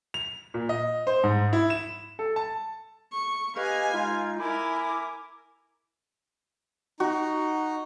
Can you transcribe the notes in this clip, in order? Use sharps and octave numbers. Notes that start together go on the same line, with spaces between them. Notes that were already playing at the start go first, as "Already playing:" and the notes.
F7
A#2
D#5
C5
G#2
E4
E7
A4
A5
C#6
G4 B4 D#5 F5 G#5
G#3 D#4 F4
E4 A#4 G#5 B5 D6
D#4 F#4